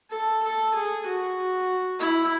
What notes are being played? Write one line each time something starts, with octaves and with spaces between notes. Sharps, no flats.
A4
A4
G#4
F#4
E4